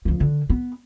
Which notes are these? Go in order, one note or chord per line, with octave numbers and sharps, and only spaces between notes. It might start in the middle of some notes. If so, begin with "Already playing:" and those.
D2 F3
D3
B3